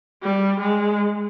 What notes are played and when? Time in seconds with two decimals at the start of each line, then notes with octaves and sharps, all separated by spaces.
0.23 G3
0.61 G#3